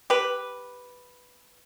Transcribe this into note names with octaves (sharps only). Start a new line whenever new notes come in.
G4 B4